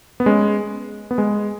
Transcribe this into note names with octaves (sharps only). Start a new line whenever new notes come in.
B3
G#3 C#4
B3
G#3